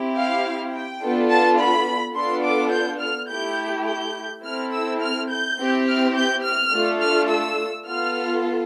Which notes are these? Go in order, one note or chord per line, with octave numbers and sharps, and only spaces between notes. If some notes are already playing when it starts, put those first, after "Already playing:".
Already playing: C4 E4 G4
F5
G5
B3 D4 F4 A4
A5
B5
B3 D4 F4 A4 C6
D6
G6
F6
A3 E4 G4 G6
G6
C4 E4 A4 F6
E6
F6
G6
C4 E4 G4
F6
G6
F6
A3 D4 F4 A4
F6
E6
B3 F4 A4 F6